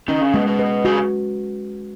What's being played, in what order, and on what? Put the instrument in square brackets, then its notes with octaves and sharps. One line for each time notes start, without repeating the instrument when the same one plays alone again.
[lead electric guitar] D#3 [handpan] C#4
[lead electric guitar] C#3
[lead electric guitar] B2 [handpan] G#3
[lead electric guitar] B2
[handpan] B4
[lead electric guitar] C#3 [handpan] F#4